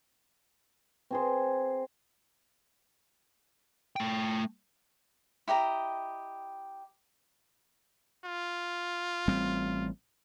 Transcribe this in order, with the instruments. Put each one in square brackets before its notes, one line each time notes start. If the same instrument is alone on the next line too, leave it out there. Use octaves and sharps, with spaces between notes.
[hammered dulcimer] C4 G#4 C5
[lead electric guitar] A3 G5
[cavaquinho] E4 G4 D#5 A#5
[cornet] F4
[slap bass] A1 G3 C4